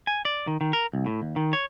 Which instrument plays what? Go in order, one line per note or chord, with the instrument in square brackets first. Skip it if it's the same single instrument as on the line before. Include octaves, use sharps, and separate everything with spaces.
[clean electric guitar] G#5
D5
D#3
D#3
A#4
C2
A2
D#2
D#3
C#5